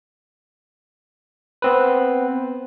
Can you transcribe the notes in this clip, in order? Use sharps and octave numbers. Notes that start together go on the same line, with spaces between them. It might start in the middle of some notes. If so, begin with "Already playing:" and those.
B3 C4 B4